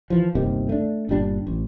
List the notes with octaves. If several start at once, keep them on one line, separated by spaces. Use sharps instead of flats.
E3 F3
G1 D#2 C3 D#3
A3 D4
G1 A#2 G3 D4
A1